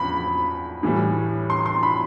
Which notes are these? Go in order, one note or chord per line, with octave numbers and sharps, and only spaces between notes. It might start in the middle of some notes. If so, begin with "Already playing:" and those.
Already playing: E2 C#3 F3 B5
A2 E3 G3
C6
C6
B5